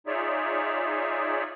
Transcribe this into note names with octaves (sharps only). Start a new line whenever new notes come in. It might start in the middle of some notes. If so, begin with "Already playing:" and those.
D#4 F4 G#4 C#5 D5 E5